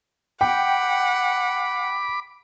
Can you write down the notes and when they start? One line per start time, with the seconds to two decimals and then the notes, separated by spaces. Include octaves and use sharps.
0.41 F#5 G5 B5 D6